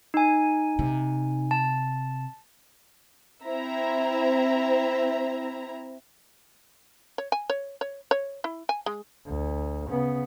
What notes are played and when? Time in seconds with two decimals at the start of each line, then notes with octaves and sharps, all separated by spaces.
0.14 D#4 G#5
0.79 C3
1.51 A5
3.45 C4 E4 E5 A#5
7.18 C#5
7.32 G#5
7.50 C#5
7.81 C#5
8.11 C#5
8.44 E4
8.69 G#5
8.86 G#3
9.26 D2
9.90 C#3 B3